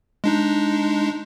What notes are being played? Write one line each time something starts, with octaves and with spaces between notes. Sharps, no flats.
G#3 D4 D#4